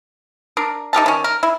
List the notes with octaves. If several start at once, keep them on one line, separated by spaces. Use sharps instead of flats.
D4 A#4
D#4 G4 A#4 A5
D#3 C#4
A#4
E4